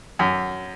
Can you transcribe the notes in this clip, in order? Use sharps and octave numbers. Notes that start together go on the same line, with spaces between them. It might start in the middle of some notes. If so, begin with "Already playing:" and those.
F#2